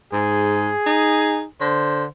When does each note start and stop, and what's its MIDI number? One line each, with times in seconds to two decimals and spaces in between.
0.13 0.71 44
0.13 1.44 68
0.86 1.44 63
1.60 2.05 50
1.60 2.04 72